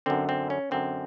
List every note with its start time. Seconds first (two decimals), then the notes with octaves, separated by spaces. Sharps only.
0.06 F#2 D3 C4
0.29 C4
0.50 C#4
0.71 F#2 D3 C4